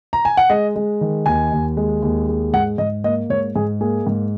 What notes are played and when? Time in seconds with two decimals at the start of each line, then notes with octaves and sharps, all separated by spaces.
0.13 A#5
0.25 G#5
0.37 F#5
0.50 G#3 D#5
0.76 G#3
1.01 D#3
1.26 D#2 G#5
1.52 D#2
1.77 G#3
2.02 D#2
2.28 G#3
2.53 G#2 F#5
2.78 G#2 D#5
3.04 A#3 D#5
3.30 G#2 C#5
3.56 G#2 G#4
3.80 A#3 G#4
4.07 G#2